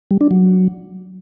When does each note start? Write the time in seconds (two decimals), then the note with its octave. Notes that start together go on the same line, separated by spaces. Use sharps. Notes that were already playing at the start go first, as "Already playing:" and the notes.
0.11 G3
0.21 D4
0.31 F#3